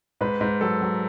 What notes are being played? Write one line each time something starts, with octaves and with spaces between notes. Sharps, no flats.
G#2 B4
G#2
F#3 A4
F#3